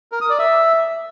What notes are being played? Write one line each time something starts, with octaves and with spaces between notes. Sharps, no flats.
A#4
D#6
D5
E5